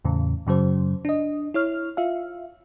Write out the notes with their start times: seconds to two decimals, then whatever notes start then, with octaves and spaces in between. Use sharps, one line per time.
0.05 E2 A2 C#3
0.47 F#2 C#3 F#3 C5
1.05 D4 D#5
1.54 E4 C#5 F6
1.97 F4 E5 F5